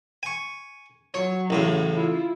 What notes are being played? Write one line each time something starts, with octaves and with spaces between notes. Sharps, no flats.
G#5 C#6
F#3 C#5
A1 A2 C#3
E4 F4